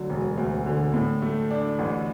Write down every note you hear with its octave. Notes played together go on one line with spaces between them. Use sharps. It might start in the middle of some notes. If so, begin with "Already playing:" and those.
Already playing: D2 D3 F#3
E1
D2
D3
A2
A3
D4
A1